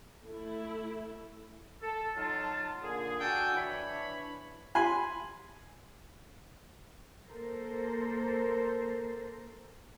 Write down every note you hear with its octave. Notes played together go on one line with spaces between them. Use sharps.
A3 E4
A4
F#3 D#4 F4 A5
A#2 D3 G#4
D4 F#4 A4 G5 G#5
E3 D4 C#5 B5
G#5 B5 C6
A#3 A4 A#4 C5